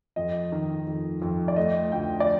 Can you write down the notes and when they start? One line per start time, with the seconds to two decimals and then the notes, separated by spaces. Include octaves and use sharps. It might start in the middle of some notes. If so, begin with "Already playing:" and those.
0.16 F2 D#5
0.52 D#3
0.87 F2
1.22 F2
1.48 D5
1.56 A3 D#5
1.92 D2 G5
2.20 D5